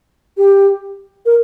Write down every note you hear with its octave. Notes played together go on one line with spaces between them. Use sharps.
G4
A#4